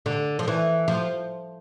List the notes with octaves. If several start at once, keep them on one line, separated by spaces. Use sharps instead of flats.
D3
F3
E3
F3